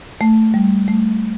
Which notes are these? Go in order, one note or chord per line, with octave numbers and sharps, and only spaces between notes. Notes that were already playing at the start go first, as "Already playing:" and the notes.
A3
G3
A3